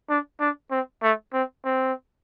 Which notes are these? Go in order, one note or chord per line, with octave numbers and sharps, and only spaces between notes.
D4
D4
C4
A3
C4
C4